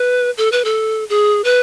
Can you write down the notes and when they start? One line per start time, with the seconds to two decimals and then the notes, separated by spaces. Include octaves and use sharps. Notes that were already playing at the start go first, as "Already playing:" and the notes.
Already playing: B4
0.38 A4
0.52 B4
0.65 A4
1.10 G#4
1.44 B4